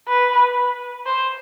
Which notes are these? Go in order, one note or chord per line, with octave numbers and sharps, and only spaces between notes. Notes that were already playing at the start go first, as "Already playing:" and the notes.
B4
C5